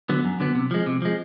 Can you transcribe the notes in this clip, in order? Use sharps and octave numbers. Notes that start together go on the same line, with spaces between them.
D3 F#3 B3
F#2
D3 F#3 B3
C3
F3 G#3
C3
F3 G#3